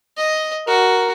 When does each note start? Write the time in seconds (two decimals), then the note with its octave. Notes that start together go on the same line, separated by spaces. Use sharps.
0.17 D#5
0.67 F#4 A#4